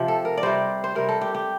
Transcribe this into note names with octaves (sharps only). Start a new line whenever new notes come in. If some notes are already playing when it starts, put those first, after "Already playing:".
Already playing: C3 F3 G4
A4
A#4
D5
C3 G3 C5
C5
C3 G3 A#4
A4
G4
G4